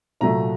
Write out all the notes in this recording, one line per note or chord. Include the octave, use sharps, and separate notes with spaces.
C2 A#2 F#3 A3 A#5